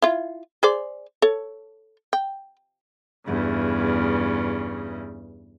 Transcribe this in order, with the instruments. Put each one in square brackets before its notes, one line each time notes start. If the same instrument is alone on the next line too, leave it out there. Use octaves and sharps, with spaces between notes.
[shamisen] E4 F4
G#4 C5 D5
A4 C#5
G5
[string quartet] E2 G2 C#3